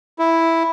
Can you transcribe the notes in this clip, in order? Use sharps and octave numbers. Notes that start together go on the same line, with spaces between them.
E4